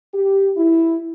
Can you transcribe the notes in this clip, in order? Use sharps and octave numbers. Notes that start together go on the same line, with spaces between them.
G4
E4